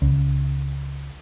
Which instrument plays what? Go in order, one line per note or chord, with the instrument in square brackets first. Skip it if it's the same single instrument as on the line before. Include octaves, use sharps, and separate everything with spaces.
[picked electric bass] C#2